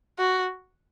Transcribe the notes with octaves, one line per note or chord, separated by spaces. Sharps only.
F#4